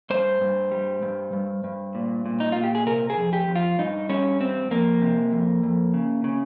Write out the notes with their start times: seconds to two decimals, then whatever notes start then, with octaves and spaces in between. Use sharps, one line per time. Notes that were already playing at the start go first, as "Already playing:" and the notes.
0.10 G2 C5
0.41 G2
0.71 G3
1.02 G2
1.33 G2
1.64 G2
1.95 A#2
2.26 A#2
2.40 D#4
2.52 A#2 F4
2.64 G4
2.75 G#4
2.87 C3 A#4
3.10 G#4
3.18 F2
3.33 G4
3.48 F2
3.56 F4
3.79 G2 D#4
4.09 G3 C#4
4.40 G2 C4
4.71 F2 A#3
5.02 C3
5.32 F2
5.63 F2
5.94 C#3
6.24 C#3